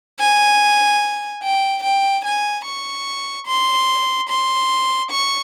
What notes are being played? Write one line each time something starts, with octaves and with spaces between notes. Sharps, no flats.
G#5
G5
G5
G#5
C#6
C6
C6
C#6